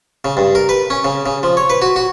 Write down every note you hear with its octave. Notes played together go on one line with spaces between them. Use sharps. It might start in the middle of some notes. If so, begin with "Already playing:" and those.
C#3
G2
A#4
B4
C#4
C#3
C#3
F3
C#5
B4
F#4
F#4